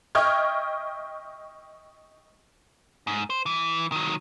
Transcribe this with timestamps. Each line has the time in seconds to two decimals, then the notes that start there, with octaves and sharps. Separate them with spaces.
0.15 D#5 E5 G5 C#6 F6 G#6
3.07 G#2
3.30 C5
3.46 E3
3.92 D#3 F#3